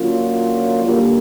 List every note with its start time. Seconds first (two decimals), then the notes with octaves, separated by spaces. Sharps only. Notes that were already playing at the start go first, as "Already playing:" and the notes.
Already playing: D3 F#3 A#3 C#4 F4
0.85 D3 G3 A#3